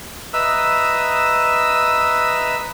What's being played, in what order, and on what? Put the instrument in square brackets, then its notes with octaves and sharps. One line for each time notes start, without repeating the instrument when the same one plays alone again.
[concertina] B4 D#5 E5 A#5 D#6 E6